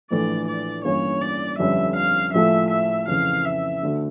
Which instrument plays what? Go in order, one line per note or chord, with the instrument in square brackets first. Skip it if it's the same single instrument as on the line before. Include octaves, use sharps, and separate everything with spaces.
[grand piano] A#1 A2 E3 A3 D4 [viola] D5
[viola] D5
[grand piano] G1 G2 E3 A#3 C#4 [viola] C#5
[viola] D5
[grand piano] G1 F2 D3 G3 C#4 [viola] E5
[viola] F5
[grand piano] A#1 A2 F3 A3 [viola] E5
[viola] E5
[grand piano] F2 C#3 E3 [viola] F5
[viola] E5
[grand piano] D2 D3 A3